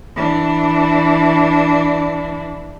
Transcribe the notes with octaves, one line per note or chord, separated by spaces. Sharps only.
E3 D4